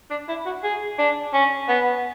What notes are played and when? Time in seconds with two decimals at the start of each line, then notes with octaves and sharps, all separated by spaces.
0.11 D4
0.28 E4
0.46 F#4
0.63 G#4
0.98 D4
1.33 C#4
1.69 B3